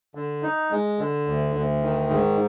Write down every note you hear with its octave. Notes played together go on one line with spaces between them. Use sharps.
D3
D#4
G#3
D3
D2
D2
D#3
G#2